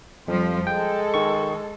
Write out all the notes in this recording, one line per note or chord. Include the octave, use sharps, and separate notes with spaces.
F2 F3 G3 C5
G#3 A4 G5
D#3 C#6